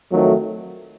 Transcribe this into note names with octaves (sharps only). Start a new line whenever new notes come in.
F2 D#3 F#3 A3